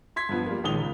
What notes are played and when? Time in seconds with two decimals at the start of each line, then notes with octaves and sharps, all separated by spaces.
0.16 C6 G#6 B6
0.29 G2 F3 B3
0.46 G3 A#3
0.64 A#1 D#3 G#3 D#6 F7 G7
0.79 C#2